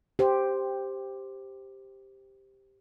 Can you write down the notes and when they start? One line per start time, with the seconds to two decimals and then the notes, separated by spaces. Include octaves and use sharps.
0.19 G4 C5